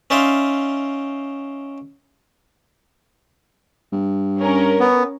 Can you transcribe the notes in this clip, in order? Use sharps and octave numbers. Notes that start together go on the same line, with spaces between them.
C#4 D#4 D5 E5 F5 C6
G2
C#4 A#4
B3